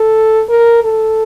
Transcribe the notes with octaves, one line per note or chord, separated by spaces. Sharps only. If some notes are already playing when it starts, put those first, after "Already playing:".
Already playing: A4
A#4
A4